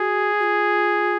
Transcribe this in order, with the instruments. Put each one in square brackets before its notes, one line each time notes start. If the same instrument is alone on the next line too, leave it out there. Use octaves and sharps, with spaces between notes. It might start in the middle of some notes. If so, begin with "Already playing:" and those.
Already playing: [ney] F#4 [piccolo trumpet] G#4
[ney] F#4
F4